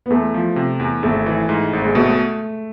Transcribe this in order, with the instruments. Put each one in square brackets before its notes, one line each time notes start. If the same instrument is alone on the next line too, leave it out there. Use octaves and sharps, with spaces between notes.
[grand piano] B3
[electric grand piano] E2 [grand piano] A3
[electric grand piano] F3
C3
E2
[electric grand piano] G#1 [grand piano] A3
[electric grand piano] E3
G#2
G#1
[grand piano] G#3
[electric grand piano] B2 [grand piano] A3